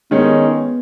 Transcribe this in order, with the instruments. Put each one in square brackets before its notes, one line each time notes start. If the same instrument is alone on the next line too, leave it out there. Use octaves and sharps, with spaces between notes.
[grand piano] D#3 G#3 C#4 [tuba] B3